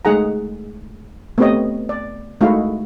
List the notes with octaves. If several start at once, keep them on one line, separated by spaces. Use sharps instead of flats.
G#3 A3 D#4 G#4 F#5 A#5
A3 B3 C4 G4 C#5 D#5
D5
G#3 A3 D#4 E4 F#4 F5